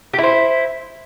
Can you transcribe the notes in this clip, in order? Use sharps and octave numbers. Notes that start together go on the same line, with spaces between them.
E4 G4 C5